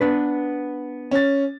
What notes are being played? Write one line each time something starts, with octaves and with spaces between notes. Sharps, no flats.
B3 D4 B4
C#4 A6